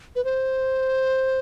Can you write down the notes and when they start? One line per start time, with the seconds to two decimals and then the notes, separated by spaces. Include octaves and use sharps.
0.16 B4
0.25 C5